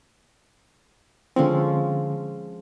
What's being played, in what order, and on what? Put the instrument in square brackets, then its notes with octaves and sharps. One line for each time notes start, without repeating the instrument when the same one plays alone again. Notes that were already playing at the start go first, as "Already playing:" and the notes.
[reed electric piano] D3 C4 [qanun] F3 G#3 C#4